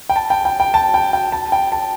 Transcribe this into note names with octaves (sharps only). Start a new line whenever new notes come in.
G5
A5
G5
G5
G5
A5
G5
G5
A5
G5
A5